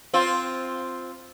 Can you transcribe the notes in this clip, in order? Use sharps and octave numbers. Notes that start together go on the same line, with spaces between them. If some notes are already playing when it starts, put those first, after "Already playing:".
C4 F4